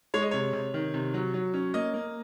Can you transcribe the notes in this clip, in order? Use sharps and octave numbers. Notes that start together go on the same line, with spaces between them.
G#3 C#5
D#5
C3 C#5
C3
D#3
C3
F#3
F#3
C#4
A#3 D#5
A#3